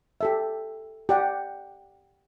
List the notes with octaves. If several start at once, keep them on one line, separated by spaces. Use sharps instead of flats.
G4 A4 E5
G4 D5 F#5